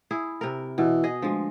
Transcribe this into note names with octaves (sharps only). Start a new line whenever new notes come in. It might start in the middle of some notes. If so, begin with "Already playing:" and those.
E4 G#4
C3 A#4
B2 E3
G#4 D#5
D2 F3 G#3